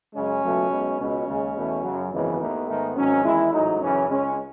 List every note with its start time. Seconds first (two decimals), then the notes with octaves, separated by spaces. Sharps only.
0.14 F#2 C#3 G#3 C#4
0.42 C#2 B2 F#3 A3
0.71 B1 B2 G#3
0.98 C#2 B2 G#3 C#4
1.27 D#2 C#3 G#3
1.55 E2 B2 A3
1.83 F#2 C#3 F#3
2.11 G#1 F#2 C#3 E3 G#3 B3
2.39 D#2 D#3 A3
2.68 G#2 D#3 A3
2.96 G#1 G#2 D#3 F#3 C#4
3.24 E2 D#3 G#3 E4
3.52 A1 G#2 F#3 A3 D#4
3.81 F#2 C#3 E3 C#4
4.09 C#2 C#3 G#3 C#4